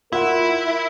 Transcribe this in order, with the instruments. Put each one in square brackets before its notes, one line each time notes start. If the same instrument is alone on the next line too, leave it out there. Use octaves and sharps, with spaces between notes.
[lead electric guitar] E4 [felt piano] F4 F#5 [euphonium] A#4